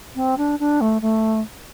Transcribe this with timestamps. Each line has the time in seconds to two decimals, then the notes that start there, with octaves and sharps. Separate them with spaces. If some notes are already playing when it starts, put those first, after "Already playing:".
0.16 C4
0.38 D4
0.60 D4
0.81 A3
1.02 A3